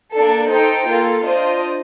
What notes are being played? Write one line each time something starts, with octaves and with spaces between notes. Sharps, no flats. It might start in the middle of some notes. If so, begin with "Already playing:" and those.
A#3 D4 A4
D#4 A4 C5 G5
A#3 F4 A4
D4 F4 C5 D#5